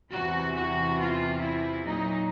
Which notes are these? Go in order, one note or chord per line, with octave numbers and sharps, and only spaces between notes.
E2 C3 E3 F#4
F#4
F4
E4
A#2 F#3 D#4